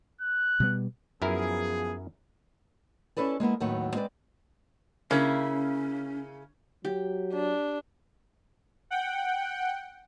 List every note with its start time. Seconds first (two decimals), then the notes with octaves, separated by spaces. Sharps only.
0.21 F#6
0.60 B2 G3 B3
1.22 F#2 F3 B3 E4 G#4 A#4
3.17 C#4 D#4 E4 A4 B4 D5
3.40 G#3 A#3 B3 E4
3.60 D#2 A2 D#3 F#3 B3 F#5
3.95 G#3 C4 B4 D5
5.11 C#3 A#3 C#4 E4
6.85 F#3 G4
7.34 D4
8.90 F#5 G5